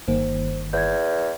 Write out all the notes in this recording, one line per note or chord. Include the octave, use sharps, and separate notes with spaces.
G1 D#3 A#3 C5
E2 G6 G#6